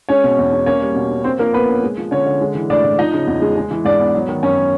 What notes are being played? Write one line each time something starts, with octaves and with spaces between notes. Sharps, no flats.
G#3 C#4 C#5
B2
E2
C#4
A#3 C#4 C#5
G3
B2
C#4
A#3 C4 C5
F3 A#3 A#4
A#2 B3 B4
C#4
G#3
F3
D3 C#4 C#5
D3
G#3
E3
A2 D4 D5
A2
F3 D#4 D#5
C#3
E2
G#3
G#3
E3
G#2 D4 D5
B3
F#3
D#3
F#2 C#4 C#5
B3